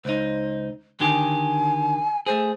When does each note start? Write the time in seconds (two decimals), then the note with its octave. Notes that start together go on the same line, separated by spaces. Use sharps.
0.05 C#2 D#4 C5
1.00 D3 D#3 G4 G#5
2.26 A3 G#4 C5